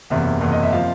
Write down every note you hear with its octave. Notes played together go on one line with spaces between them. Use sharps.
F#1 E2 C3 E5
F#1 E2 C3
D#5
E5
C3 F3 F5